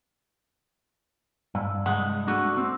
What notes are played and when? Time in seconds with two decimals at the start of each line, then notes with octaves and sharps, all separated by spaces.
1.55 G2
1.86 C2 G2 G#3 F#5
2.27 A3 D4 F#4
2.57 C4